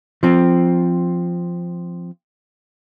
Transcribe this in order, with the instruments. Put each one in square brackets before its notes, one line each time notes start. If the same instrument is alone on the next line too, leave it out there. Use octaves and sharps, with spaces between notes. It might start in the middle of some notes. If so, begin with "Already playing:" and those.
[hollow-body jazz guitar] F3 C4